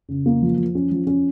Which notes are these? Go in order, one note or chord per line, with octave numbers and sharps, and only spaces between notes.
C#3
A#3
F3
F3
C#4
F3
C#4